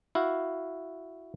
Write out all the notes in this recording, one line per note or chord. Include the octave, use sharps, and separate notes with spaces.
E4 F#4 F5